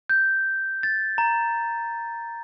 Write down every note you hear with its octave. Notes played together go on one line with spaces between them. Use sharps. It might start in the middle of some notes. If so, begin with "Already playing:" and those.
G6
A6
A#5